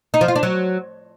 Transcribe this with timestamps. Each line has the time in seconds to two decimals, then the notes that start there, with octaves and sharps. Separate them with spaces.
0.14 D#4
0.21 F3
0.28 F4
0.36 D4
0.43 F#3